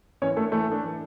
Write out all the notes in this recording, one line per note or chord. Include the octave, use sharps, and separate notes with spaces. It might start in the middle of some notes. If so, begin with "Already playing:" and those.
E3 C#4 C#5
A3 A4
D4
E3 A3 A4
A3 D4
E3